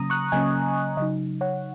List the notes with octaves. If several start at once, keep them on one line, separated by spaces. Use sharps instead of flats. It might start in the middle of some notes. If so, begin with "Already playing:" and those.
Already playing: C#3 F#3 A#3 C#4 A#5 D#6
C#6 F#6
C#3 F#3 A#3 C#4 D#5 G#5
C#3 F#3 D#4 D#5
C#5 F#5